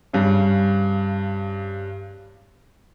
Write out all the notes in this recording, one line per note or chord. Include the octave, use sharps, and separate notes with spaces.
G2 C#3